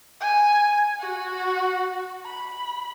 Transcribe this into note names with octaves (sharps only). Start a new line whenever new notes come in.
G#5
F#4
B5